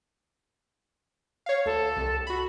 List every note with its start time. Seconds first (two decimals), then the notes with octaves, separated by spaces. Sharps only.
1.46 C#5 F5
1.66 D2 A4
1.97 C2
2.27 F#4 B5